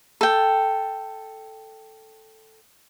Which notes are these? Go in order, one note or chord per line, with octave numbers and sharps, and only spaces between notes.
A4 G5